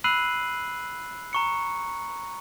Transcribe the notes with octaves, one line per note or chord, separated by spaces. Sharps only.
B5 E6 F#6 C7 D#7 F#7
A#5 C#6 C#7